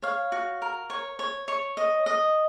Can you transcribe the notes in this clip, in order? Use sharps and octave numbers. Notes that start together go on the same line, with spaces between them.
C#5 F5
F#4
A#4
C#5
C#5
C#5
D#5
D#5